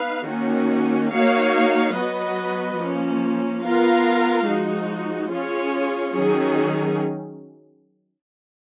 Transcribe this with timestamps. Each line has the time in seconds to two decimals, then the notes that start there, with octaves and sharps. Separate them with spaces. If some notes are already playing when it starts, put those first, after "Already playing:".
Already playing: B3 D#4 B4 F5
0.27 D#3 A#3 C#4 F#4
1.12 A#3 D#4 F#4 C#5 F5
1.95 F#3 B3 F#4 B4 D#5
2.79 F3 A#3 C#4
3.62 B3 F4 A#4 F5
4.46 F3 G#3 D#4 F#4
5.30 C#4 F4 G#4 C#5
6.14 D#3 F#3 C#4 G#4